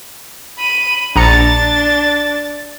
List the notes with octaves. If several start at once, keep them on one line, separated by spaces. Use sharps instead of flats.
B5 D#7
A#1 D4 A#5 A6 C#7